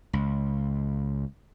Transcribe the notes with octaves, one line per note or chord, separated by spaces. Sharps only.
C#2